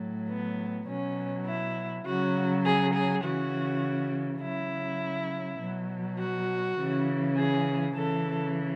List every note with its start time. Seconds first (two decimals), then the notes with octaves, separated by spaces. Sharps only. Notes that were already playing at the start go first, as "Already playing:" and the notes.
Already playing: A2 F#3
0.28 B3
0.88 B2 F#3 C#4
1.46 E4
2.05 C#3 F#3 F#4
2.65 G#4
2.94 G#4
3.24 C#3 E3 F#4
4.41 C#3 F#3 E4
5.60 B2 F#3
6.19 F#4
6.77 C#3 E3
7.37 G#4
7.95 C#3 E3 A4